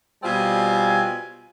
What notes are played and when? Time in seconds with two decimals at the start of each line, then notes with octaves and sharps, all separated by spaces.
0.23 B2 G3 C4 F4 G#5